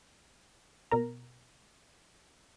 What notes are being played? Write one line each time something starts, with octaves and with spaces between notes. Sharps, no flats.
B2 A#4 A#5